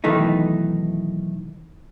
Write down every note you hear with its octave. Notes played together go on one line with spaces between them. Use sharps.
B1 D#3 E3 A3 D#4